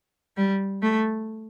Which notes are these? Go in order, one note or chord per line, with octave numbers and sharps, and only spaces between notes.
G3
A3